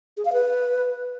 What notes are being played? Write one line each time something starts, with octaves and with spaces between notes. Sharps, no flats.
G#4
F5
B4